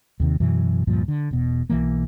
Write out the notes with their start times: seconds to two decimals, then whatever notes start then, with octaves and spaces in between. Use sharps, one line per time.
0.20 D#2 C3 D#3
0.40 F#2 B2 E3 F#3
0.87 D2 G2 A#2 F3
1.08 D3
1.31 E1 B2
1.70 B1 E3 A#3